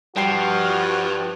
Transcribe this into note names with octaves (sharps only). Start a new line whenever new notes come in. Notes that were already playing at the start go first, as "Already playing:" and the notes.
G2 F3 G3 F#4 G5 C7